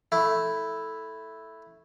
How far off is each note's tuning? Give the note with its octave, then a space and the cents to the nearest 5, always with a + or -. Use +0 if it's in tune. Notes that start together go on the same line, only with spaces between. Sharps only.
A3 +0 E4 +0